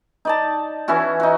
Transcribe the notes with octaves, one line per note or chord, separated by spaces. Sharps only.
D#4 D5 A5
E3 C#4 E4 F#4
D#4 F#4